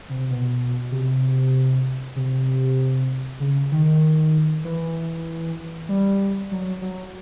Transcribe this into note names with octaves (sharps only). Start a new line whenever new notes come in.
C3
B2
C3
C3
C#3
D#3
E3
G3
F#3
F#3